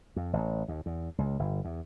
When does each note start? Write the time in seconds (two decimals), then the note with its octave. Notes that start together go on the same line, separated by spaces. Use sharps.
0.16 F2
0.33 A1
0.68 D#2
0.86 E2
1.18 C#2
1.39 G1
1.65 E2